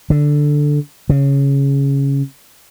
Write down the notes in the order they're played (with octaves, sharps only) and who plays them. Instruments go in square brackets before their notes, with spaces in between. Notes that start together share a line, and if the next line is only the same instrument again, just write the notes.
[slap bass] D3
C#3